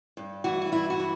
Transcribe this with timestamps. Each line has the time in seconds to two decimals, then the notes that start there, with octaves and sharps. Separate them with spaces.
0.17 G2
0.44 E3 F#4
0.62 F#4
0.72 G2 E4
0.90 F#4
1.00 E3